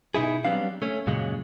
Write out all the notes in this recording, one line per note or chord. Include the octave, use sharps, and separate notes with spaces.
B2 D#4 E4 G#4
F#3 G3 B3 C4 D4 F5
A3 C#4
F#2 A#2 C#3 F#3 G#3